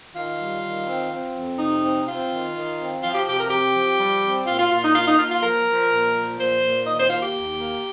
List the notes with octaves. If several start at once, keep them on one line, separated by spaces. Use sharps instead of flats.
D#3 F4
G3
D#3
C4
C4
F2
C3 D#4
C4
C4 F4
D#3
D#3
C4
F3 F4
G4
C3 G4
A#4
C4 G4
F3
G3
C4
A#2 F4
F4
A#2 F4
D#4
A#3 F4
D#4
A#3 F4
F4
F3 A#4
F3
A#2
F3
A#2 C5
A#2
D#3 D#5
C5
A#3 F4
G4
D#2
A#3